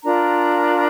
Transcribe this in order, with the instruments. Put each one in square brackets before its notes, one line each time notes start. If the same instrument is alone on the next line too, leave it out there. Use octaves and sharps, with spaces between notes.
[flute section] D4 F4 A#4 A#5